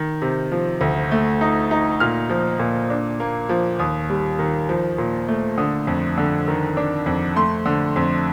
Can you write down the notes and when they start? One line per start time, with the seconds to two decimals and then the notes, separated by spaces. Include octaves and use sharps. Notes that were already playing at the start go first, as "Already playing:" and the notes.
Already playing: D#3
0.22 C3
0.52 F3
0.81 D2
1.11 A3
1.41 D#4
1.71 D#4
2.00 A#2 F6
2.30 F3
2.59 A#2
2.90 D4
3.20 A#3
3.49 F3
3.79 D#2 D#6
4.09 G3
4.39 D#3
4.69 F3
4.98 A#2
5.28 A3
5.58 D3 D#6
5.87 F2
6.18 D3
6.48 D#3
6.77 D4
7.06 F2
7.36 A3 C6
7.66 D3
7.96 F2